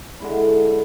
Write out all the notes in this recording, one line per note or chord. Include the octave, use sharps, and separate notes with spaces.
D3 G#3 E4